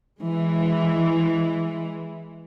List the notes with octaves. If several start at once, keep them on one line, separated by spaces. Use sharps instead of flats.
E3 G#3